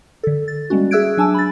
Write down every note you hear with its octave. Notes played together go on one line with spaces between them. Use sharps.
D3 A4
A6
G3 G#3 A#3 C#4 F#4
G#4 E5 E6 F#6 G#6 D7
F#3 D4 G#5 A5 E6
B5 A6